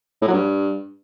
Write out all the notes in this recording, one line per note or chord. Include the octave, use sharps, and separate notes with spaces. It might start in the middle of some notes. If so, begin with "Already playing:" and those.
A2
F#3
G2